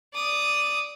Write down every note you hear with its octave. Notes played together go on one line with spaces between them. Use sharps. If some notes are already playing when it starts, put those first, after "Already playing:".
D5 D#6